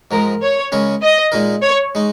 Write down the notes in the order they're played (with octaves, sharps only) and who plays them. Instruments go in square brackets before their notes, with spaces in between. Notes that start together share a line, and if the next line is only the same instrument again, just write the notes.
[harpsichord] G#2 F3 G#3 [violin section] A#4
[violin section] C#5
[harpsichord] C#3 G#3 C#4 A#4
[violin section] D#5
[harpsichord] A#2 G#3 D#4 A#4
[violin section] C#5
[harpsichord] G#3 D#4